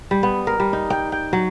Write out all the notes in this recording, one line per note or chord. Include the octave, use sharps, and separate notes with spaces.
G3
B3
A#4
G3
D#4
G5
G5
F#3